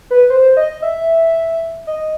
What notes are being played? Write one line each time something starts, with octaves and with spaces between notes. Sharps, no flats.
B4
C5
D#5
E5
D#5